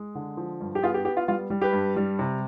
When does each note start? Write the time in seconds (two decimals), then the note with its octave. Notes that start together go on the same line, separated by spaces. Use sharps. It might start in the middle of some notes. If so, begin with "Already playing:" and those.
Already playing: G#3
0.15 D3
0.37 F3
0.61 G2
0.75 G4
0.82 B3 F4 G#4
0.94 G4
1.05 B3 G4
1.17 F4
1.28 G3 F4
1.50 G3
1.61 G4 B4
1.73 G2
1.96 G3
2.19 C3